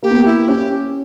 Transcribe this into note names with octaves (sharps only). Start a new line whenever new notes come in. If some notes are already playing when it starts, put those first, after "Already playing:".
A#3 G4
B3
A#3
E4
C#4 G4